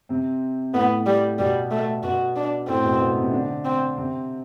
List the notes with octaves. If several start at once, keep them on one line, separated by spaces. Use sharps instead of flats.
C3 C4
A2 A3 B3
G3
B2 G3 B3
A3
B2 B3 F#4
D4
A2 A3 C4
B2 B3
B2 B3
C3 C4
D3 D4
C4
C3 C4